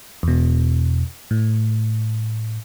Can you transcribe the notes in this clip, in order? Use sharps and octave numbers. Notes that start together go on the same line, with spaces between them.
E2 B2
A2